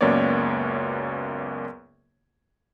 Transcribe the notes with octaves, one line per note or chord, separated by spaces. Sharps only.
C#2 F#2 A#3 B3 C#5 D5